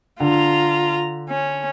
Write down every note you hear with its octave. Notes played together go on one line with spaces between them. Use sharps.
D3 F4 A#5
C#4